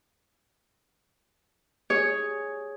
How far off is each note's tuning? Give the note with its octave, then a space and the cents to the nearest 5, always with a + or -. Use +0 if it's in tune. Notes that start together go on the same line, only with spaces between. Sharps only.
G#4 +0 C#5 +0